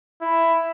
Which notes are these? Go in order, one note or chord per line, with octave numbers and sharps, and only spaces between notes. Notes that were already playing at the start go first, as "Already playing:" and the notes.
E4